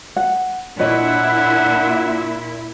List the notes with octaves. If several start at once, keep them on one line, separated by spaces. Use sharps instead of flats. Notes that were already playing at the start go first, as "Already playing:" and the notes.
F#5
A#2 D4 E4 C#5 D#5 E5 F#5